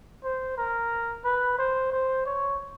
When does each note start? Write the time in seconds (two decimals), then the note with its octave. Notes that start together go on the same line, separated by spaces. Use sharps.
0.24 C5
0.58 A#4
1.24 B4
1.58 C5
1.92 C5
2.26 C#5